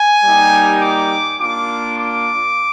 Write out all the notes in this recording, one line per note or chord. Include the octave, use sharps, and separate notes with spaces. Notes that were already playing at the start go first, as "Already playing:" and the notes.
Already playing: G#5
G3 A#3 D#4 G4
D6
A#3 D4 F4 D6
D6